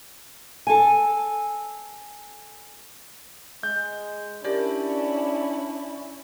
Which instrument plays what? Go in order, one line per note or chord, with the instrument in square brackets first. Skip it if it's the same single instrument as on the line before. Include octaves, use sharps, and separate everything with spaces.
[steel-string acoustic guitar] A4 G#5
[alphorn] G#3 [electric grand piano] G6
[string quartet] C#4 E4 [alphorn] D4 [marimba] G4 A#4 [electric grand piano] D5